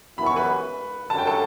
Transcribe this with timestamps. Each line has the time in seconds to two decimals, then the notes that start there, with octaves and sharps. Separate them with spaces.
0.17 F#2 E3 B3 E4 B5
0.26 C#6
0.36 B4 B5
1.09 F#2 D3 F#3 A5
1.18 G5
1.27 A4 A5